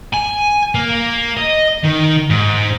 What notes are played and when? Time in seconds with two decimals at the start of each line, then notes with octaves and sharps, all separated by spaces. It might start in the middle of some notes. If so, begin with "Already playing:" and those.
0.13 G#5
0.75 A#3
1.37 D#5
1.84 D#3
2.30 G#2